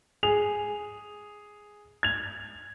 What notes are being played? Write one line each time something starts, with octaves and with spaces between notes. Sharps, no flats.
G#4 F7
G#6 F7